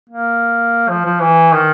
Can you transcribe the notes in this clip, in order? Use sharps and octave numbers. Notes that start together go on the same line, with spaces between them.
A#3
F3
F3
E3
D#3